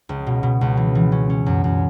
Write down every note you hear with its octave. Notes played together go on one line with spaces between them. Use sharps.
C#2
B2
B2
C#2
E3
E3
C#4
C#4
F#2
F#2